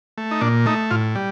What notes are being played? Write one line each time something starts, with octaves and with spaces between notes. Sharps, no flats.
A3
D#4
A#2 D4
A3 D#4
A2 F4
G3